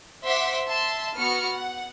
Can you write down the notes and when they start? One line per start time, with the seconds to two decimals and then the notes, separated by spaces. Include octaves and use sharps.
0.24 C5 E5 F#5 C6 D6 B6
0.66 E5 A5 C6
1.15 B3 F#4 F6 C#7
1.50 F#5